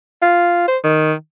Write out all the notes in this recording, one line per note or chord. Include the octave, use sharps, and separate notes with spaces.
F4
C5
D#3